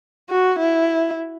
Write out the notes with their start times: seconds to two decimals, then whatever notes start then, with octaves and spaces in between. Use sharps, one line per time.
0.30 F#4
0.59 E4